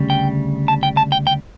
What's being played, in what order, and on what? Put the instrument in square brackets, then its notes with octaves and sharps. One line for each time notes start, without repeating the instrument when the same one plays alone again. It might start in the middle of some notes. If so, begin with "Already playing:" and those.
Already playing: [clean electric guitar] D2 C#3 G3
G5
A5
G5
A5
G5
G5